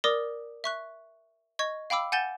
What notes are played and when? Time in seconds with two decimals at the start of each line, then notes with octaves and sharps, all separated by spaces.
0.04 A#4 D5 D6 D#6 A#6
0.64 E5 C#6 F#6
1.59 D#5 C#6 G#6
1.90 F5 G5 B5 D6 E6
2.12 F#5 G#5 G6 A6 E7 G7